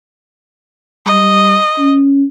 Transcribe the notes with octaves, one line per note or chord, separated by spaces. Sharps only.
G3 D#5
C#4